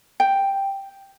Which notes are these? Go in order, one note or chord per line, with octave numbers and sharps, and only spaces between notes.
G5